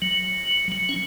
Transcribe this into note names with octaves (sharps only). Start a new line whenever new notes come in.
F#3
F#3
C#4